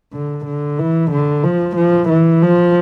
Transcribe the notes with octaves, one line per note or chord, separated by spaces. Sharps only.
D3
D3
E3
D3
F3
F3
E3
F3